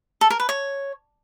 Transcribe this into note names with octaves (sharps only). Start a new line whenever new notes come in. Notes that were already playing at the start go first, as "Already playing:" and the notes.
A4
A#4
B4
C#5